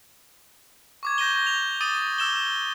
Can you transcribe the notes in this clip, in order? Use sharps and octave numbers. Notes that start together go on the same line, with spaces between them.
C#6 D6 G#6
G6 A#6 D#7 G7
F7
D6 D#6 A6 D#7
D6 E6 E7 G7